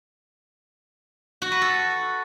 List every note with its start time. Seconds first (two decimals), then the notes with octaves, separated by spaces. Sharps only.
1.42 F#4
1.52 B4
1.62 A4